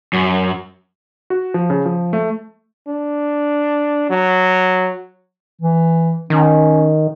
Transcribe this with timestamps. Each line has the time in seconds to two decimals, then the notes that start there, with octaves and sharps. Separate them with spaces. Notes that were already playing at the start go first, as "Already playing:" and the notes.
0.13 F#2
1.30 F#4
1.54 F3
1.70 C#3
1.86 F3
2.13 A3
2.87 D4
4.10 F#3
5.61 E3
6.30 D#3 C#4